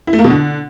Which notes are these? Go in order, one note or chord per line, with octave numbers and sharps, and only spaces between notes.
E4
A3
A#3
B2
D3